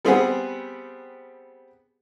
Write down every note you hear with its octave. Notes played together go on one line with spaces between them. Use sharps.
G3 B3 C4 G#4 B4 F#5